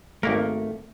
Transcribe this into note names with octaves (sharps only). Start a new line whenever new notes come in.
G#1 A3 A#3 A#4